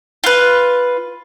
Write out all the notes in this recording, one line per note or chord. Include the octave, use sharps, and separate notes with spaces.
F4 B4